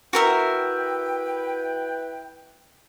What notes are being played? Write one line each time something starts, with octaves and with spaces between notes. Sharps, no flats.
E4 F#4 A#4 B4 E5 G5